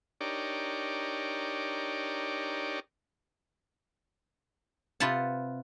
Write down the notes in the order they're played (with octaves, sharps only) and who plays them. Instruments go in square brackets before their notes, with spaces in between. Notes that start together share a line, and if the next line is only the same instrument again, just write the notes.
[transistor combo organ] D4 D#4 G4 A#4 C#5 D5
[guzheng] C3 F4 B4 F#5 A5